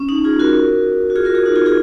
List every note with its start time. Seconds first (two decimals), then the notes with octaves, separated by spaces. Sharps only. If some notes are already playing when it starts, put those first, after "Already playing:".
Already playing: C#4
0.09 D#4
0.24 F4 G#4
0.39 F#4 A#4
1.10 F#4
1.16 F4 G#4
1.25 F#4 A#4
1.35 F4 G#4
1.45 D#4 F#4
1.56 F4 G#4
1.66 F4 G#4